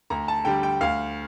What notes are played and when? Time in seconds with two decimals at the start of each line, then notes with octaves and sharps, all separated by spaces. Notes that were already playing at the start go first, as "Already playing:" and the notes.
0.10 D2 A#5
0.28 A5
0.45 D3 G3 G5
0.63 G5
0.81 D2 F5